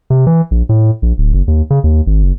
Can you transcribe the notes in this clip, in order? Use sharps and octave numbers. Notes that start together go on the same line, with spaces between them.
C3
E3
A#1
A2
A#1
D1
F#1
D#2
C#3
D#2
G#1
F#1